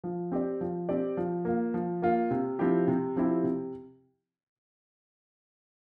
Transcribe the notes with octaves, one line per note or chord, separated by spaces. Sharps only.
F3
C4 G4 D5
F3
C4 G4 D5
F3
A#3 F4
F3
A#3 F4
C3
F3 C4 E4 G4
C3
F3 C4 E4 G4
C3